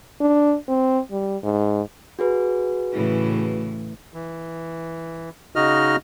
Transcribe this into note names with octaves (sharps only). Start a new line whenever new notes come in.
D4
C4
G3
G#2
F#4 G#4 B4
A2 C#3 E3
E3
C#3 D#4 F#4 D#5 F6